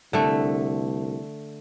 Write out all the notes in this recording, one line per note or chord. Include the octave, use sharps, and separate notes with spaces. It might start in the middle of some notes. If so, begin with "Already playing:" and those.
C2 D3 A3